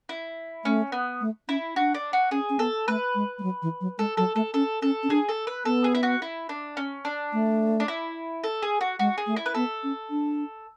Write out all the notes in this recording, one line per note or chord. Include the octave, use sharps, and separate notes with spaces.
E4
A3 C#4
B3
A3
C#4 E4
D4 F#4
D4
F#4
C#4 G#4
C#4
B3 A4
A3 B4
G#3
G#3
F#3
E3
F#3
G#3 A4
F#3 A4
A3 A4
C#4 A4
C#4 A4
C#4
D4 G#4
A4
B4
B3 A4
G#4
E4
F#4
E4
D4
C#4
D4
A3
D4
E4
A4
G#4
F#4
G#3 F#4
G#4
A3
E4
B4
B3 A4
C#4
D4